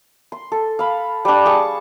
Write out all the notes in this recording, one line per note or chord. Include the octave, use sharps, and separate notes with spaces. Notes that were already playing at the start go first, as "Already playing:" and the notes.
C6
A4
F5 B5
G3 D4
G#4 A5 C#6